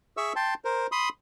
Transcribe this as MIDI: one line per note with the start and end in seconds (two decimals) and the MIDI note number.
0.17 0.33 68
0.17 0.33 76
0.17 0.33 85
0.17 0.33 88
0.36 0.54 79
0.36 0.54 81
0.36 0.54 84
0.65 0.87 70
0.65 0.87 72
0.92 1.09 83
0.92 1.09 84
0.92 1.09 87